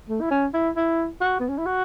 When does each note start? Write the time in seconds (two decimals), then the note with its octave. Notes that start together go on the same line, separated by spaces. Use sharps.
0.09 A3
0.21 E4
0.31 C#4
0.54 E4
0.76 E4
1.21 F#4
1.40 B3
1.49 C#4
1.58 E4
1.66 F#4